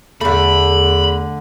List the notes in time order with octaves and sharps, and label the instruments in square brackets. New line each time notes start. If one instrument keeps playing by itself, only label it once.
[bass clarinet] E2 [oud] D3 A3 [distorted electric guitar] B5